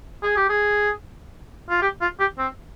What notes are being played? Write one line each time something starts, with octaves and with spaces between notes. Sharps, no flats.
G#4
G4
G#4
F4
G4
F4
G4
C4